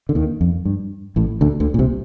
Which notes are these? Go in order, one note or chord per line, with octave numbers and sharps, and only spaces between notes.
D3
D#2 D#3
F2
G2
A1 A2
D2 D3
D2 D3
A#2
C2 C3